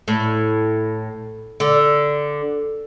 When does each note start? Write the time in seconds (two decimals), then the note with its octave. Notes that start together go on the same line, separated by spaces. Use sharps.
0.08 A2
1.60 D3